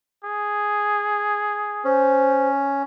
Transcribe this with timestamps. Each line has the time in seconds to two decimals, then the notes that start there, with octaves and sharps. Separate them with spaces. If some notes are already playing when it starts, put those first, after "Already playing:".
0.24 G#4
1.85 C#4 C5